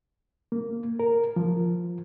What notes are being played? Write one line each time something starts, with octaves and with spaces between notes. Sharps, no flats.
A#3
A#4
F3